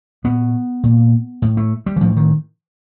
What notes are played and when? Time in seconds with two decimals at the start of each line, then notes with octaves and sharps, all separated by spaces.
0.24 A#2 B3
0.83 A#2
1.42 A2
1.57 A3
1.86 G3
1.96 E3
2.01 A2 F3
2.16 D#3